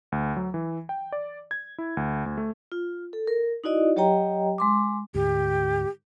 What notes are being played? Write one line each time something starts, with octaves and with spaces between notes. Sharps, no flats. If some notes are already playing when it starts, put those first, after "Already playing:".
D2
F#3
E3
G5
D5
G#6
E4
D2
D2
A3
F4
A4
A#4
D#4 E4 F#4 D5 D#5
F#3 G4 C#5 D#5 G5 A#5
G#3 C6 D6
D2 G#2 G4